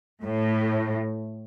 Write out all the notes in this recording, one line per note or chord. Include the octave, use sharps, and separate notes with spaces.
A2